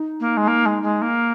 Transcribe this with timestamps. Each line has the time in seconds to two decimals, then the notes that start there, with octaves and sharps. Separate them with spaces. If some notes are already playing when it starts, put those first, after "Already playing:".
Already playing: D#4
0.20 A#3
0.37 G#3
0.47 A#3
0.65 G#3
0.82 G#3
1.01 A#3